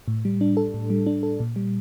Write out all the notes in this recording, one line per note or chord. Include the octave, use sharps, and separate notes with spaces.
A2
G3
D4
A4
A2
G3
D4
A4
A#2
G3